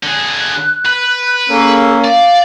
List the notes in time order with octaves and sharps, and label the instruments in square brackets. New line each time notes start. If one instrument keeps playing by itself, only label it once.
[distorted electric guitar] D3 G#4 [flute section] F#6
[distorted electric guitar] B4
[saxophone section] A#3 C#4 [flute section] G#4 A4 E6
[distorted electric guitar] D5 [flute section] F5